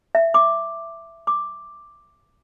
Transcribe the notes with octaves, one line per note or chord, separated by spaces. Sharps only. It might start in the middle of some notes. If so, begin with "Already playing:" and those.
E5
D6
D6